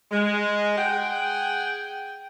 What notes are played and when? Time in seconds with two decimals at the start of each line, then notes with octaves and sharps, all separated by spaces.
0.11 G#3
0.78 G#4 F#5 G5